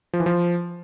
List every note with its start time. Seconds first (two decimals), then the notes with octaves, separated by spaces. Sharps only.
0.13 F3
0.20 E3
0.26 F3